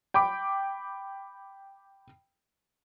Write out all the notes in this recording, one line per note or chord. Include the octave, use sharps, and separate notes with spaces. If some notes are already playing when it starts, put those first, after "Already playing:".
G5 B5 D6